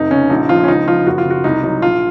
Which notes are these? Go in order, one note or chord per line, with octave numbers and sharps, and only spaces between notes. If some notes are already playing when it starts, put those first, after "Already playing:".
Already playing: F1 D#4
C#3 C#4
A#1 D#4
F3 F4
C#4
C#2 D#4
F3 F4
F#1 F#4
F4
C#3
F#4
C2 D#4
F#3 D#4
A#1 F4